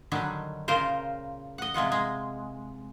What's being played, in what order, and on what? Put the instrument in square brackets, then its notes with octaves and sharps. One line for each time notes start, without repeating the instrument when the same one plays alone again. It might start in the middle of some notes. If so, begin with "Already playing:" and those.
[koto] D3 D#3 F#3 G3
A#2 C#3 F4 A#4 C5
D#5 F#5
C3 G#3 F4 F#5
G#3